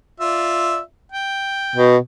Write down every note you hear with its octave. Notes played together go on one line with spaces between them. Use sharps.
F4 D5 E5
G5
B2